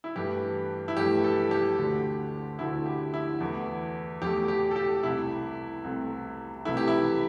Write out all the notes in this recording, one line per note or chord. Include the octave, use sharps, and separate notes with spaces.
E4
G2 E3 A3 G4
E4
G2 E3 A3 G4
A4
G4
D2 D3 A3
D2 D3 A3 E4
G4
E4
E2 E3 A3
E2 E3 A3 G4
G4
A4
G4
C2 C3 A3 E4
C2 C3 A3
C2 C3 E3 A3 E4
G4
E4